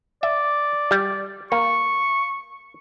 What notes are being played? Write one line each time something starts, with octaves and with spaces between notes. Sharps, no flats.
D5 E5
G3
A#3 C#6